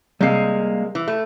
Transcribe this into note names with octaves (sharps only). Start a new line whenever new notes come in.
C3 G3 G#3 A#3 F5
E3
A3